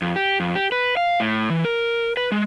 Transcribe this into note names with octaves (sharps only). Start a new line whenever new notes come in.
F2
G4
F2
G4
B4
F5
A2
E3
A#4
B4
G#3